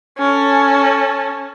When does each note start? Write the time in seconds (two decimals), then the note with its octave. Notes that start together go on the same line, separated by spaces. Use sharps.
0.19 C#4 A4